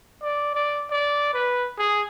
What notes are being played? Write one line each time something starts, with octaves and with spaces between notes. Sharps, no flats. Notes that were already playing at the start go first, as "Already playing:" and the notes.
D5
D5
D5
B4
G#4